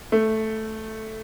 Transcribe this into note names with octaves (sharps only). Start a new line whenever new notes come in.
A3